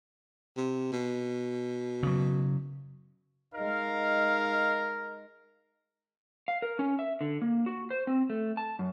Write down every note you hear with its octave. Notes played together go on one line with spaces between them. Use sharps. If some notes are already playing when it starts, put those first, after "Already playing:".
C3
B2
C#3 F#3
G#3 D#4 A#4 F5
F5
A#4
C#4
E5
D3
A#3
F#4
C5
C4
A3
A5
F#2